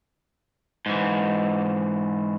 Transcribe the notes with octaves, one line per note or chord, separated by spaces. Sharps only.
G#2 E3